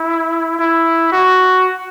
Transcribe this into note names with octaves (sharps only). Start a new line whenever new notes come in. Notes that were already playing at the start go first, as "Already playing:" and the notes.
Already playing: E4
E4
F#4